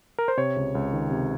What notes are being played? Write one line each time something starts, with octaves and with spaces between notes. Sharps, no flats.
A#4
C5
C3 C#5
C#2
C#2
D#3
C3